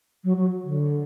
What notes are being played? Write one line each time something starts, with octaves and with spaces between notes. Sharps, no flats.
F#3
F#3
D3